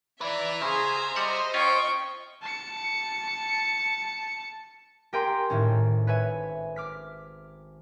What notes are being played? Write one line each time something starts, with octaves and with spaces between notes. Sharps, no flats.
E4 B4 D5 E5 A#5
C#3 G#4 C5
G3 D#5 F#5
C#4 F4 G5 C#6
A5 C#7
G4 A#4 G5 G#5 A#5 C6
G#1 A2 C#4
B4 C#5 E5 G#5
D6 F6 B6